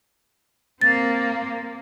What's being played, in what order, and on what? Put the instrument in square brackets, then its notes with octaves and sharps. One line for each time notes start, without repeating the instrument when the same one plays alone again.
[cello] A#3 C4 [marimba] A6